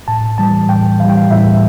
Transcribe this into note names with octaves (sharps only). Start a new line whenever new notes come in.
A2 A5
E3 G3 A5
A2 G5
E3 G3 F5
G5
F5
A2 E5